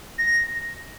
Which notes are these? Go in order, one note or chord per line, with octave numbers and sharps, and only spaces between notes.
A#6